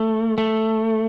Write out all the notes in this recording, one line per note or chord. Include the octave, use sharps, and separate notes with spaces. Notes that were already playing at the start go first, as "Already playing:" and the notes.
Already playing: A3
A3